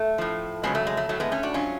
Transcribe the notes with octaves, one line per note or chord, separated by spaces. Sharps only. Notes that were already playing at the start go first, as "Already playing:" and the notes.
Already playing: A3
A2 F3
F2 C#3 F#3 G#3 B3
A3
G#3
A3
A2 F#3 A3
G#3 B3
A3 C#4
D4 F#4
G#2 F#3 C#4 F4